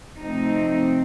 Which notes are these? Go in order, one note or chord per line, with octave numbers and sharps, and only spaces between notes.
C3 F3 A3 C4 D#4